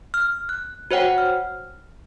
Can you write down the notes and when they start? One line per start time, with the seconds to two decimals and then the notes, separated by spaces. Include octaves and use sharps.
0.14 F6
0.49 F#6
0.91 F#4 C5 C#5 F#5 G5
1.18 F6